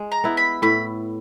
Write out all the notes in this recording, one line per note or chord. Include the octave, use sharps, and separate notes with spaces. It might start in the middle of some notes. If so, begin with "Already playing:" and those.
Already playing: G#3
A#5
B3 E4
B5
A2 B5